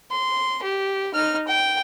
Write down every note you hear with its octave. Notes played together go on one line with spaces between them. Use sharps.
C6
G4
D#4 F6
G5